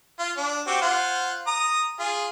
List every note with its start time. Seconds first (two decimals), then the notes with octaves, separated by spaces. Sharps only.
0.19 F4
0.38 D4
0.67 C4 F#4 G4
0.81 F4 C5 F#5
1.47 A#5 D#6
1.99 F4 G#4